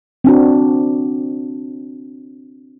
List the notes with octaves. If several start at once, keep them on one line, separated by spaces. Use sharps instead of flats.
C4 D4 F#4